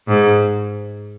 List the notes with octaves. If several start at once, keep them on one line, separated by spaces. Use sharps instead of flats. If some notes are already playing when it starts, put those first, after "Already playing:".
G#2